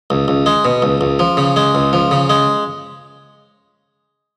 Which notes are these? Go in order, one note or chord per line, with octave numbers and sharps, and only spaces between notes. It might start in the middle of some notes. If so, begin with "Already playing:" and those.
C#2
C#2
G#3
B2
C#2
C#2
F3
C#3
G#3
C#2
F3
C#3
G#3